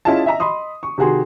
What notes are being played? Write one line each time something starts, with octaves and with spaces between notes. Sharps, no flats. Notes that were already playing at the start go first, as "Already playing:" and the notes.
C#4 E4 F4 G#4 D#5 A5
D#5 E5 A#5
D#5 B5 C6 D#6
C#6
C3 D#3 F#4 G#4 C6